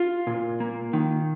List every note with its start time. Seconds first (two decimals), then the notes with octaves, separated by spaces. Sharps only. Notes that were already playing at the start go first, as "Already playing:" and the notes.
Already playing: F4
0.27 A#2
0.60 A#3
0.93 D#3